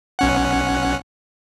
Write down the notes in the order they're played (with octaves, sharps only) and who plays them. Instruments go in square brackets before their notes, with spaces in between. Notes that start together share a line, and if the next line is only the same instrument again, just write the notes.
[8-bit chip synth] B1 C#4 F#5